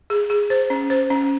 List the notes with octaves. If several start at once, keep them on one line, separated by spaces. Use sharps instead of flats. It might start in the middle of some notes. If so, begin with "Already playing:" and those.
G#4
G#4
C5
C#4
C5
C#4